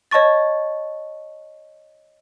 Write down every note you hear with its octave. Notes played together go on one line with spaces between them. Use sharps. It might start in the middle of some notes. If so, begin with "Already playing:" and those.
C#5 D#5 A5 C#6 A6